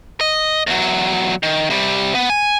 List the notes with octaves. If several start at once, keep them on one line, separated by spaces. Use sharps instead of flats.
D#5
E2 F#3
D#3
C3 G3
B3
G#5